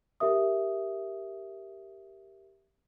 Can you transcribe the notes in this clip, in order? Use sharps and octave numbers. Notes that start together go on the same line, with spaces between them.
G4 A#4 E5 D#6